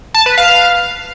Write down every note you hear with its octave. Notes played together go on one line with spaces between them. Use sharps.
A5
B4
F5